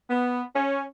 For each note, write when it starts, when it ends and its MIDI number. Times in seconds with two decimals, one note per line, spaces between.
0.10 0.43 59
0.56 0.83 61